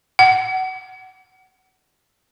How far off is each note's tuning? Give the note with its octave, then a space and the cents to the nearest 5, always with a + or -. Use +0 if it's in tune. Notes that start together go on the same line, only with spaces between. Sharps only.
F#5 +20